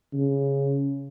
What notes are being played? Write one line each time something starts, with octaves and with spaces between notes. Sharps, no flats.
C#3